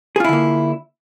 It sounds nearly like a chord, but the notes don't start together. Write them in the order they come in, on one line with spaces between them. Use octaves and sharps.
G#4 F4 E4 D3 A#3